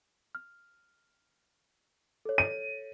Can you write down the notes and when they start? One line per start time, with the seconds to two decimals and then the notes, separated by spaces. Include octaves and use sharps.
0.35 F6
2.25 A4 C#5
2.38 D#7